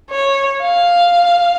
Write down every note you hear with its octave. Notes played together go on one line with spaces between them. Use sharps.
C#5
F5